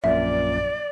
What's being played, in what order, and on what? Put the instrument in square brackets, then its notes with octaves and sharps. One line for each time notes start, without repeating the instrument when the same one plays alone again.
[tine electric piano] A#1 F#2 A#2 [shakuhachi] D5 [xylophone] E5